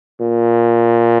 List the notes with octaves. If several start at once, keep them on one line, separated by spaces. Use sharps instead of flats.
A#2